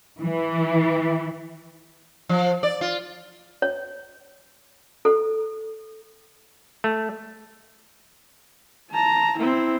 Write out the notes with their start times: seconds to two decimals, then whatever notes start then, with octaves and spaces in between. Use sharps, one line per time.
0.19 E3
2.29 F3
2.63 D5
2.81 F4
3.62 C#5
5.05 A4
6.84 A3
8.91 A5 A#5
9.37 C4 E4